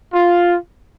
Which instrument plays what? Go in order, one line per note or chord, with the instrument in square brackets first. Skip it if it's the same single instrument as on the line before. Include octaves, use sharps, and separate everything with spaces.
[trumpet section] F4